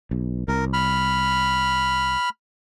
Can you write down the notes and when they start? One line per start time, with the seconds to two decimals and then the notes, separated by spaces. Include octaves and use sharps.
0.11 B1
0.48 C2 A#4
0.73 B5 F6